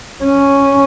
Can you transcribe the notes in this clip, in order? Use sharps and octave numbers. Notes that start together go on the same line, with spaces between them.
C#4